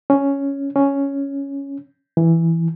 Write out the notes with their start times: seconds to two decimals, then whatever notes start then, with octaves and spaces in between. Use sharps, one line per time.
0.10 C#4
0.76 C#4
2.17 E3